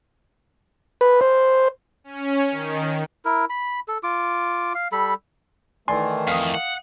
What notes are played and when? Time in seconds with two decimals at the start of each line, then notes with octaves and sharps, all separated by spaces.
1.01 B4
1.21 C5
2.04 C#4
2.51 D#3
3.25 E4 A#4
3.50 B5
3.88 A4
4.03 F4 D6
4.75 F5
4.92 G3 A4 B5
5.88 D#3 E3 A3 D5 G#5 C6
6.28 F2 F5 D#6
6.54 F#5